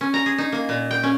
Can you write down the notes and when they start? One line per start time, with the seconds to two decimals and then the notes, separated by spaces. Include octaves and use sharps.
0.01 C#4
0.14 A#5
0.26 G#4
0.38 D#4
0.52 A#3
0.69 A#2
0.91 G5
1.03 C#4